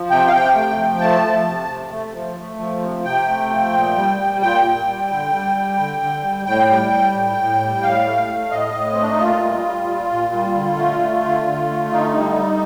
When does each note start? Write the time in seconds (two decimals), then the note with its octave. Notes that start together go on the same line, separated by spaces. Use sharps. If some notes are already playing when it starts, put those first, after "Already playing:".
Already playing: F3
0.10 C3 G5
0.28 F5
0.32 C3 G5
0.55 A3
0.77 F3
1.00 A3 A5
1.24 F3
1.46 C3
1.69 C3
1.91 A3
2.14 F3
2.38 A3
2.59 F3
2.82 C3
3.05 C3 G5
3.28 A3
3.50 F3
3.73 A#2
3.96 G3
4.19 G3
4.41 A#2 G5
4.65 A#2
4.87 G3
5.10 D3
5.32 G3
5.56 G3
5.78 D3
6.01 D3
6.23 G3
6.46 A2 G5
6.69 G3
6.92 G3
7.14 A2
7.38 A2
7.60 G3
7.82 A2 F5
8.06 A3
8.28 A3
8.50 A2 D#5
8.73 A2
8.92 A3 C4
9.02 D4
9.10 D#4
9.19 A#2 F4
9.41 G3
9.64 G3
9.87 A#2
10.10 A#2
10.33 G3
10.55 D3
10.78 A3
11.00 A3
11.24 D3
11.46 D3
11.70 A3
11.92 D3 D#4
12.14 G3
12.37 G3